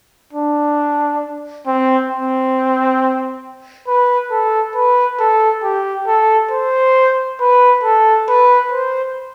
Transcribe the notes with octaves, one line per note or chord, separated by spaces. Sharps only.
D4
C4
C4
B4
A4
B4
A4
G4
A4
C5
B4
A4
B4
C5